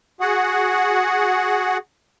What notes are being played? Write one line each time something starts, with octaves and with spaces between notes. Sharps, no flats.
F#4 G#4 F#5